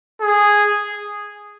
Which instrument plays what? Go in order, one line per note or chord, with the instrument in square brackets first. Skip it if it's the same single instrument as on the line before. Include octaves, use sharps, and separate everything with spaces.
[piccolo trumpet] G#4